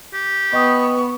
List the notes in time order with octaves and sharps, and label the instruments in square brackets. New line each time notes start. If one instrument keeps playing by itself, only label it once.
[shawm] G4
[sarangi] B3 [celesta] D#5 G5 D#6 [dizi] C#6